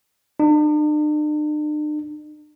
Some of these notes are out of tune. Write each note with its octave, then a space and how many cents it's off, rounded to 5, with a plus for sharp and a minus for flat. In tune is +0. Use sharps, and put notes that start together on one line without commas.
D4 +45